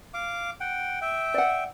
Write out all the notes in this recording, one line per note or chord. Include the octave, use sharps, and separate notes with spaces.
F5 D6
F#5 G5
E5 G5
D5 F#5